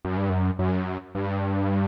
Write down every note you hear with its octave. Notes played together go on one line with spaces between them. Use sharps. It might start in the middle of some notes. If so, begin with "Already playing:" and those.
F#2
G2
F#2
F#2
G2